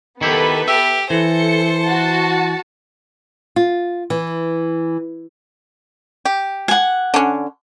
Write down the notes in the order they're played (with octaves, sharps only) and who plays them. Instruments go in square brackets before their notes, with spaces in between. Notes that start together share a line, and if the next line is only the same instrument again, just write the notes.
[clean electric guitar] D#3 E4 G4 [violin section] B3 A4 B4
[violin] G4 [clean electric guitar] E5
[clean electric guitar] E3 [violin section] A4 C#7 [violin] C5 C6
[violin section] F#4 A5
[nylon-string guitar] F4
E3
[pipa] G4
[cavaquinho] F#5 G#5
[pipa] D3 C#4